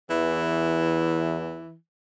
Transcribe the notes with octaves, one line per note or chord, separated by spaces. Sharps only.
E2 E3